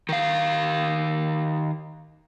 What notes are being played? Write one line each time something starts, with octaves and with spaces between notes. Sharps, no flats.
D#3 F5